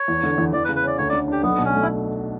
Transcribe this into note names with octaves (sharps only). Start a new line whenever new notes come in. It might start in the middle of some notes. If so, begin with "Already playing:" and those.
Already playing: C#5
E2
D3
E2
E2 D5
B4
C#3
B4
C#4 D5
D2 C#5
D3 D5
D4 G4
B1 B3
B2
C#4
A3
E4